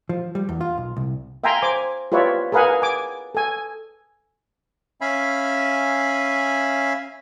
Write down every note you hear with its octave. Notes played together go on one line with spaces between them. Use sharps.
F3
G3
E2
F4
B1
C2
E5 F5 G5 G#5 A#5 C6
C5 G#5 D6
F4 G4 B4 C#5 D5 E5
G#4 A#4 B4 F5 F#5 G#5
G#5 D6
A4 G#5
C#4 E5 F5 G#5 B5